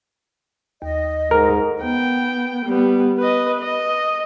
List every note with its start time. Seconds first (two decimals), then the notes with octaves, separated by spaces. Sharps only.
0.82 D#2 D#5
1.31 G#2 A4 A#4
1.82 B3 G5
2.66 G3 B3
3.19 B4 D#5
3.61 D#5